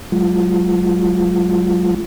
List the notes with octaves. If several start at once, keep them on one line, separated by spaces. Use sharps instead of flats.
F#3 G#3 F4